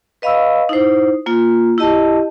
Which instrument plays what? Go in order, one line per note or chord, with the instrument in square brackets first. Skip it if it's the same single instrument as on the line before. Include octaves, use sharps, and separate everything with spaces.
[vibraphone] B4 D#5 F5 B5 C#6 E6
D#4 E4 C5
A#3 F4
E4 G4 D#5 A5